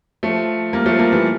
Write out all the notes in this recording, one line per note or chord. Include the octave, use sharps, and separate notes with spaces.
F3 A3
G3 A#3
F3 A3
G3 A#3
E3 G3